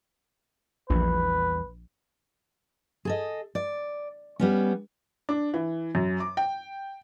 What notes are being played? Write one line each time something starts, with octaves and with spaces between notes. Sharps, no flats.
A#1 E2 E3 G3 B4
G#4 A4 D#5
D5
G3 B3 C#4
D4
E3
F#2
D6
G5